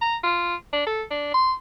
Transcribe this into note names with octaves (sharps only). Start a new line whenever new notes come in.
A#5
F4
D4
A4
D4
C6